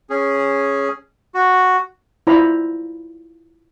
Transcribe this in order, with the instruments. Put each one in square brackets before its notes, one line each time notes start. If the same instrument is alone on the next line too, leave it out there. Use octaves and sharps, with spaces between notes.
[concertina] C#4 G#4
F#4
[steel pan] E4 F4 C5 D5 A#5 B5